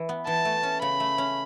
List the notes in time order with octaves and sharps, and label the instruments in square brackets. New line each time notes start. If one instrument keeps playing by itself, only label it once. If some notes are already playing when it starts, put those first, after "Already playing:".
Already playing: [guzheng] E3
B3
[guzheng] E3 [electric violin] A5
[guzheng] A3
C#4
[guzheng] C#3 [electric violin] B5
[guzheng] A3
C#4